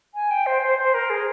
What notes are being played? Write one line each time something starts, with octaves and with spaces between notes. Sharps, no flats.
G#5
G5
C5
C5
C5
A#4
G#4